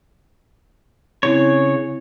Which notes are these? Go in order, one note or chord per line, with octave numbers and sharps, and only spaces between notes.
C#3 C4 E4 C#5